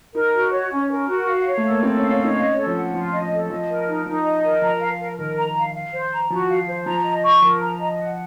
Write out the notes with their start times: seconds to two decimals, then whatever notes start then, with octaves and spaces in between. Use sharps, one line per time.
0.14 D#4 A#4
0.33 F#4
0.52 C#5
0.71 C#4
0.90 A#4
1.08 F#4
1.26 F5
1.45 C#5
1.57 A3
1.63 A4
1.70 A#3
1.83 C4 A4
1.96 C#4 F5
2.10 C#4
2.19 D#4 C#5
2.38 C#4 D#5
2.57 A4
2.67 F3
2.76 F#5
2.94 F3 F4
3.13 D#5
3.32 A4
3.50 F3 D#5
3.69 A#4
3.88 D#4
4.06 F3 D#4
4.24 D#5
4.44 A#4
4.62 F3 A#5
4.81 F5
5.00 A#4
5.18 D#3 A#4
5.37 A#5
5.56 F5
5.74 F5
5.93 C5
6.12 A#5
6.30 F3 F#4
6.49 F5
6.67 C5
6.86 F3 A#5
7.05 D#5
7.23 C#6
7.42 F3 A#4
7.60 A#5
7.80 D#5
7.99 F#5